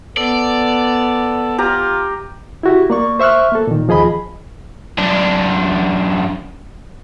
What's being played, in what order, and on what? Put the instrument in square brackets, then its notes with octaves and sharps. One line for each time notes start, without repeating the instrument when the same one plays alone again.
[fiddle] B3 [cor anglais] A4 [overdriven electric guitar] D5
[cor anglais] F4 [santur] G4 A#5
[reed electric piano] E4 F#4 G4
A#3 D5 C#6
C5 E5 C#6 F6 F#6
A#3 A4
A#2 D#3
D#2 F3 G#4 D#5 B5
[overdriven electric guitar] F#2 D4